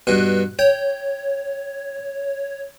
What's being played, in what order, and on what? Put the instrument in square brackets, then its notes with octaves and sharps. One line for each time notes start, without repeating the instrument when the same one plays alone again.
[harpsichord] G2 B2 [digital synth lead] F#6
[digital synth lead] C#5 [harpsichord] G5